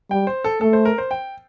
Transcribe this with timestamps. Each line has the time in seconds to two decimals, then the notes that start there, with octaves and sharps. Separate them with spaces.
0.10 G3 G5
0.27 C5
0.44 A4
0.61 A3 A4
0.73 C5
0.85 A#4
0.98 C5
1.11 G5